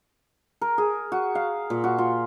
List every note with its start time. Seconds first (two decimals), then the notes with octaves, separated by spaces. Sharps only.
0.61 A#4
0.78 G#4
1.12 F#4
1.35 F5
1.70 A#2
1.84 F#4
1.98 F4